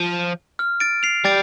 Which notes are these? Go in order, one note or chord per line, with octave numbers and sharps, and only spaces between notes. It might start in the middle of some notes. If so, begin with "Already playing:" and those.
Already playing: F3
F6
A6 D7
C7 F7
G3 A6 D7